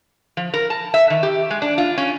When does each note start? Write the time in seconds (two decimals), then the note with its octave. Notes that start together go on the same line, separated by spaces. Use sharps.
0.37 F3
0.54 A#4
0.70 A5
0.94 E5
1.10 D#3
1.23 G4
1.50 G#3
1.62 D4
1.78 F4
1.97 C#4